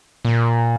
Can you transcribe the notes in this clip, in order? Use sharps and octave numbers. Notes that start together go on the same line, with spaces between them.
A#2